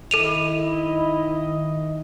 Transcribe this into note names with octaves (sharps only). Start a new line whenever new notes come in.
D#3 E4 A4 D#5 D#7 F7